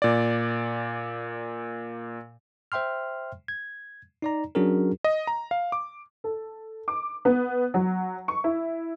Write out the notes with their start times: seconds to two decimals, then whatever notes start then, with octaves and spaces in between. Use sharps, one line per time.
0.02 A#2 D5
2.72 C5 E5 G5 C6 F6
3.48 G#6
4.22 D#4 D5 A#5
4.55 F#3 C#4 D4 F#4 G#4 A#4
5.04 D#5
5.27 A#5
5.51 F5
5.72 D6
6.24 A4
6.88 D6
7.25 B3
7.74 F#3
8.28 C#6
8.44 E4